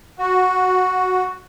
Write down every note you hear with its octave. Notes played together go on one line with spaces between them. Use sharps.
F#4